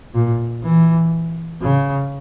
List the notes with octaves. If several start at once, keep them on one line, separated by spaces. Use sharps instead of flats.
A#2
E3
C#3